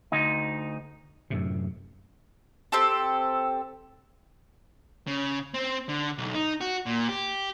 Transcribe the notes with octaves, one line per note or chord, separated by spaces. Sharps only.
D2 D#4
F#2 A2 C3
C4 G4 A4
C#3
C4
D3
B1
D#4
F#4
A#2
G4